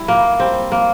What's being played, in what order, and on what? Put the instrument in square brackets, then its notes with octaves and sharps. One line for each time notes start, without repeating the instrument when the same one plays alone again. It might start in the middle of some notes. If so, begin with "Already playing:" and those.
Already playing: [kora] G3 E4
A#2 A#3
G3 C4
A#3